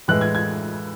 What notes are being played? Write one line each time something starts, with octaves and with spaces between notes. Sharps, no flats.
A2 E3 G#3 F#6
G#6
G#6